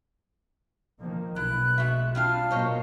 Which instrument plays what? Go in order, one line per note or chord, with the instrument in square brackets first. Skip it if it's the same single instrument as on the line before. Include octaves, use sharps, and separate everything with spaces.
[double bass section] D#3 F3 A#3
[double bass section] B1 [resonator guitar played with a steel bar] E4 [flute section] F#6
[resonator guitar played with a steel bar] G#3 F#4 E5
[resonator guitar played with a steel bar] G3 C4 F4 [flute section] F5 A5 F6
[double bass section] B2 F#3 A#3 [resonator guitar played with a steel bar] C5 C#5 D#5